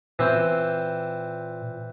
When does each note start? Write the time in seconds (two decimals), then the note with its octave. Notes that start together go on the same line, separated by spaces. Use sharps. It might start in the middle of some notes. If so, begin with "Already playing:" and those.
0.19 A#2 E3 C4 G5